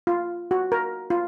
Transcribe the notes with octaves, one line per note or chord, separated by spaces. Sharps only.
F4
F#4
A#4
F4